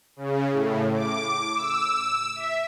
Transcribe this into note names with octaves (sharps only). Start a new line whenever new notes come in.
C#3
A2
D6
E6
E5